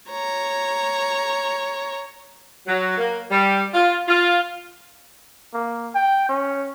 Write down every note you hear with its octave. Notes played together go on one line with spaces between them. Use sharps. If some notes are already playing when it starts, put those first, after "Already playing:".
C#5 A#5
F#3
A#3
G3
F4
F4
A#3
G5
C#4